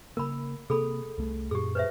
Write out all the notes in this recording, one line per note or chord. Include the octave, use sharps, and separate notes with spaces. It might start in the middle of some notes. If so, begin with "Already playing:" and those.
C#3 A#3 A#4 B5
C3 A#3 G#4 A4 B5
C2 A3
F#2 A#2 G4 G#4
B4 C5 E5